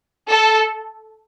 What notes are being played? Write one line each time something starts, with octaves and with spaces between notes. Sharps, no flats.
A4